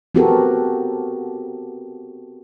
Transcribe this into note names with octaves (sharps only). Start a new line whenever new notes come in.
B3 C4 F#4 G4 A4 A#4